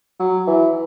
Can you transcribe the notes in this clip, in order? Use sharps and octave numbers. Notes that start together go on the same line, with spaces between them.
F#3
E3